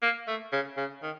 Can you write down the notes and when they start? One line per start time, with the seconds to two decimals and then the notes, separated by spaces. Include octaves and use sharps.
0.02 A#3
0.28 A3
0.52 C#3
0.77 C#3
1.03 D#3